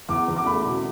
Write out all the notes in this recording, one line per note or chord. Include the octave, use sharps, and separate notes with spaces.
E2 D6
E2
D6
A3 B5
B2